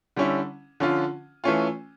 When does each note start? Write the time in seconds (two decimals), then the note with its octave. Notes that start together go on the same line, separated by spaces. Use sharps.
0.16 D3 G3 C#4 E4
0.80 D3 F3 C#4 F4
1.44 E3 A3 C#4 F4